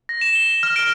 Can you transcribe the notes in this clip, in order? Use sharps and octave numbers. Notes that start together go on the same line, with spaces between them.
A#6
E7
G7
F6
D7